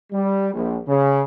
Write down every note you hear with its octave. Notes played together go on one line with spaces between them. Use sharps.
G3
A#1
C#3